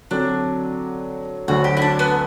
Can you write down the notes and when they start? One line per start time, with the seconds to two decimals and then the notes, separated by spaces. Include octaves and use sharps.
0.11 D3 F#3 C4 D4 F#4 A4
1.48 D2 D3 F#3 F#4
1.64 G4
1.77 E4
1.82 D4
1.99 B3